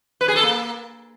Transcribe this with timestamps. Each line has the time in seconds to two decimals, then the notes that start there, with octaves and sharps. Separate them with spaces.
0.21 B4
0.28 G#4
0.36 A4
0.43 A#3